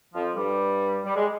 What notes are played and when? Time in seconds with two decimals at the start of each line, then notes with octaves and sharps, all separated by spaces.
0.15 F2 F3
0.36 G2 G3
1.05 G3
1.15 G#3